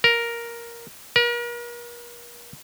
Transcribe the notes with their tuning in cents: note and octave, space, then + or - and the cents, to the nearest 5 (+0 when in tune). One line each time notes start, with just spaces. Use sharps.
A#4 +5
A#4 +40